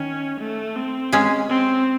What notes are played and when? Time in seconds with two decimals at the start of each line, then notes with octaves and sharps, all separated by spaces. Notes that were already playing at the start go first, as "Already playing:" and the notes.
Already playing: D#3 C#4
0.40 A3
0.76 C4
1.12 G#3 C#4 G#4
1.49 C4